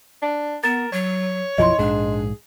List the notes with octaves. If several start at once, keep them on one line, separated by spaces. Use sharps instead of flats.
D4
B3 A#4 A6 E7
F#3 C#5
B1 F#2 F3 E4 D#5 C6
A#1 G#2 D4 G#4